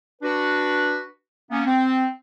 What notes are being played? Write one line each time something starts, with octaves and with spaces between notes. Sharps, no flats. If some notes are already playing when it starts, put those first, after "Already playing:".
D4 F#4 B4
A#3 B3 C#4
C4